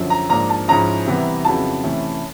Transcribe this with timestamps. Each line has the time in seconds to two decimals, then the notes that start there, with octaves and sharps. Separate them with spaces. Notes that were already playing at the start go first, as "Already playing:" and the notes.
Already playing: F#2 D3 F3
0.10 A#5
0.29 G#2 F3 A#3 D4 A#5
0.50 A5
0.68 G#2 F3 G#3 C#4 E4 A#5
1.06 C3 E3 G3 B3
1.45 F2 C#3 F#3 B3 E4 A5
1.84 C3 E3 A3 C#4 E4